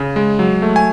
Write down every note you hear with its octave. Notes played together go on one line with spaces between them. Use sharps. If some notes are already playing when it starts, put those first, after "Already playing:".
Already playing: C#3
G#3
F#3
A3
G#5